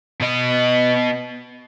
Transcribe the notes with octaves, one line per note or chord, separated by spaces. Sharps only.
B2 D#5